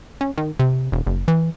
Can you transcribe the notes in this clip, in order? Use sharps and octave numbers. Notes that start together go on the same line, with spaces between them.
C#4
D#3
C3
E1
F#1
E3